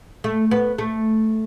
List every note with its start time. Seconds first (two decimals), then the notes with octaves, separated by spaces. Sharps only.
0.24 A3
0.51 B3
0.78 A3